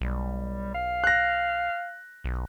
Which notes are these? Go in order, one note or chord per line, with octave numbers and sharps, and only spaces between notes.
B1 G3
F5
F#6 A#6
B1